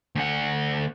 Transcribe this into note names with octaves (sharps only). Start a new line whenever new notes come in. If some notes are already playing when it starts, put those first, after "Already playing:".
D2 F#5